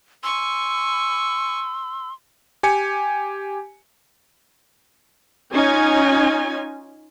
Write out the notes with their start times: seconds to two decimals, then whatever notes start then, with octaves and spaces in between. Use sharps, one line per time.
0.23 G#5 C6 C#6 E6
2.63 G4 G#5 C#7
5.53 C#4 D#4 F4 G#5